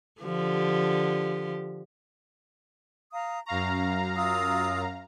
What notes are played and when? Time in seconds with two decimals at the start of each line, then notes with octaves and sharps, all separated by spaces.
0.21 D3 F3 G4
3.12 F5 A#5 D#6
3.46 F#2 F5 A#5 C#6
4.15 F4 D#6 E6